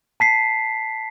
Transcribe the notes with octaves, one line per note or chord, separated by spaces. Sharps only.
A5 B6 C7